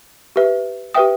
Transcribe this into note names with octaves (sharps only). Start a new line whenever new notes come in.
G4 B4 E5
G4 B4 E5 G5 D#6